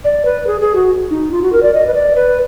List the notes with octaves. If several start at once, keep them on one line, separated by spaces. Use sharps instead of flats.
D5
B4
G#4
G#4
F#4
D#4
F4
F#4
A#4
D5
D#5
B4
D5
B4